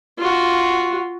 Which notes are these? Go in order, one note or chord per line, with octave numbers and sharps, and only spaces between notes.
F4 F#4